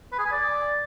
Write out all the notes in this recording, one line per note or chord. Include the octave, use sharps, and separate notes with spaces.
B4
G#4
G#5
D5